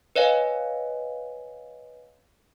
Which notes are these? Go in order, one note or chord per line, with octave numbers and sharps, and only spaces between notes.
B4 C#5 D#5 F5 G#5